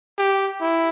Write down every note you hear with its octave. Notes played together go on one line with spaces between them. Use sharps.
G4
E4